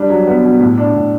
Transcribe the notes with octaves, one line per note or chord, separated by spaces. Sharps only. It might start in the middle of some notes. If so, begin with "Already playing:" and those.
Already playing: G3 D4
F#3
B3
B2
A2
D4
A2